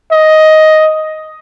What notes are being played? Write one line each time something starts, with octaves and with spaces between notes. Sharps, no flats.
D#5